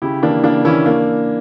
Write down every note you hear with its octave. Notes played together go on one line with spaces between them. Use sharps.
C#3 E4 G4
E3 A#3 D4
C#3 A#3 D4
E3 A#3 C#4 E4
A#3 D4